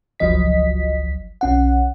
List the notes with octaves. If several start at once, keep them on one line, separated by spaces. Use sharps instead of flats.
G1 C#2 F3 F#3 D#5 B6
B1 C#4 F#5